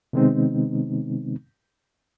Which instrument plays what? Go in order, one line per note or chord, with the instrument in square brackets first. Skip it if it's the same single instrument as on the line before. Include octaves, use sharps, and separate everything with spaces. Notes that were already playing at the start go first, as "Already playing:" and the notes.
[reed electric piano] C3 D#3 G#3 B3 C4 D#4